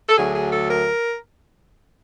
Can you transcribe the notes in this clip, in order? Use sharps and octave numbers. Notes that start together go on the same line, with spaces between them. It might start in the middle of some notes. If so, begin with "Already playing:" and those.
A4
D2 D3 F#3 A3 G#4
G#4
A4
A#4